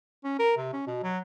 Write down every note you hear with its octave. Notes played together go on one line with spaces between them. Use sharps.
C#4
A#4
C3
C#4
B2
F#3